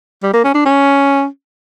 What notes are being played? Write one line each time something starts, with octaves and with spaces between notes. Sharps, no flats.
G3
A#3
C#4
D4
C#4